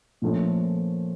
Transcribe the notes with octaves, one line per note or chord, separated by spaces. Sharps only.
A#2 F3 A3 C#4